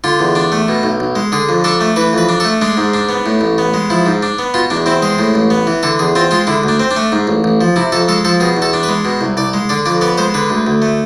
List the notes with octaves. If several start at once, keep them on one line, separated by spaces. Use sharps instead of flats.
D3 F4
E2
D4
A3
B2
B1
B1
G#3
D3 G#4
F2
D4 A4
A3
E3 B4
F2 B4
D4
A4
A3
G#3 D4
G#2
D4
B3
A2
A1
B3
G#3
F3 E4
G#2
D4
B3
B2 F4
E2 D4
C4 E4
G#3 G#4
A2
A1
B3
E3
D3 A4
E2 G#4
C4 F4
G#3 F4
D3 E4
D2 D4
C4
D4
A3
G#2
A1
A1
F3
C3 E4
F2 A4
G#3 A4
F3 A4
B2 G#4
E2
A4
D4
B4
G#3
B2
C2
C2 D5
G#3
D3 D5
F2 D5
B3 D5
G#3 C5
D3 B4
D2
D2
A3